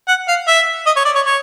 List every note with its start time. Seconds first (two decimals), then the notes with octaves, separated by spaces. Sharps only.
0.08 F#5
0.28 F5
0.47 E5
0.86 D#5
0.96 C#5
1.05 D5
1.16 C#5
1.26 C#5